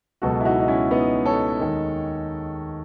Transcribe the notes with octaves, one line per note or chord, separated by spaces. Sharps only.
C#2 B2 F#3 F#4 A4
E4
D#4 F#4
D#4
C#4 E4
B3 D#4
A4 C#5
D#2 D#3 G#3